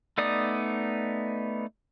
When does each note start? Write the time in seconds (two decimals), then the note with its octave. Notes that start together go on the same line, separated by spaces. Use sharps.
0.18 A3 B3 D#4 D5 D#6